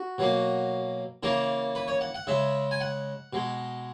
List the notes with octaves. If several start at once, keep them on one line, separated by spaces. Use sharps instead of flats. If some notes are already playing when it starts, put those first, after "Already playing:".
Already playing: F#4
B2 F#3 A#3
C#3 E3 A#3 A#4
B4
C#5
F#5
F#5
C#3 G#3 E5
G#5
F#5
B2 G#3